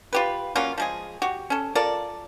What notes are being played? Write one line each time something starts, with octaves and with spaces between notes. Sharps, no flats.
F4 G4 B4
F#3 A#3 C#4 F4
F3 G#3 G#4
F#4 G4
C#4 A4
F4 A4 A#4 D5